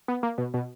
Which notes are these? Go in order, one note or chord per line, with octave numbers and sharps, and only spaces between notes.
B3
A#3
B2
B2